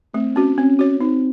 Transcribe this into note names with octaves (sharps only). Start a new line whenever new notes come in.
A3 C4
C#4 F#4
C4 C#4
F#4 C#5
C4 D#4